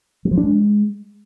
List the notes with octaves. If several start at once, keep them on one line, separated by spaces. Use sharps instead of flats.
F#3
F3
D4
G#3